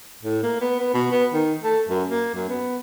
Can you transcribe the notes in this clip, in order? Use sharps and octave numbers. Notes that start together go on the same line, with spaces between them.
A2
A#3
B3
B3
B2
B3
D#3
A3
F#2
A#3
F#2
B3